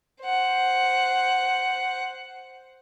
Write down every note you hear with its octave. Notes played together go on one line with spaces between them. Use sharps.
C5 F#5